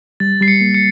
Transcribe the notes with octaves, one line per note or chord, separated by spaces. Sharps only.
G3 A6
G3 C7
C#7
A#3
C#7